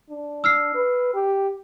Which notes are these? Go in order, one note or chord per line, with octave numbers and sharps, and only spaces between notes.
D4
E6 F6 C7
B4
G4